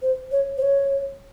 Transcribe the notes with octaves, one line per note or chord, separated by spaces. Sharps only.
C5
C#5
C5
C#5